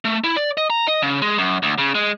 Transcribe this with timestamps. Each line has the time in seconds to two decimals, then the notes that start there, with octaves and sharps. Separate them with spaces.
0.05 A3
0.24 E4
0.36 D5
0.57 D#5
0.70 A#5
0.87 D#5
1.02 C#3
1.22 G#3
1.38 F#2
1.63 D2
1.78 C#3
1.95 G#3